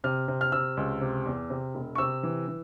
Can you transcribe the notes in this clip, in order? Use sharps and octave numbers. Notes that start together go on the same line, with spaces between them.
C3 F6
C3
F6
C3 E6
C#2
C3
E2
C3
E1
C#6
C3 E6
E3
E3